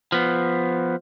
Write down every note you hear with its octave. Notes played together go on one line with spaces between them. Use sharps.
F3 B3